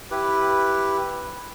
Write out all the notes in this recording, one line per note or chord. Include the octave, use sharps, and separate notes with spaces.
E4 G4 B4